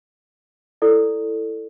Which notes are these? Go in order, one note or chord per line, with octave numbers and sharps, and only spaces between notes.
E4 A4 D5